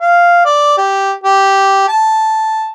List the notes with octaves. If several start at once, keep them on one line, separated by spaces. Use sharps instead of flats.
F5
D5
G4
G4
A5